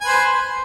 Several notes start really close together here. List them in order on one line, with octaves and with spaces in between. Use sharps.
G#5 B4 C5